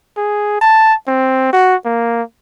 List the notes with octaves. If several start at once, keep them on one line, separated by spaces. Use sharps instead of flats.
G#4
A5
C4
F#4
A#3